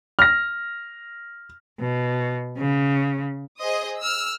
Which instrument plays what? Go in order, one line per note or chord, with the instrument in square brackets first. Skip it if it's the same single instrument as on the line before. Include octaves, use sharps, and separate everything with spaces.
[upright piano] F6 A#6
[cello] B2
C#3
[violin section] G#4 C5 D#5 D#6
E6 F6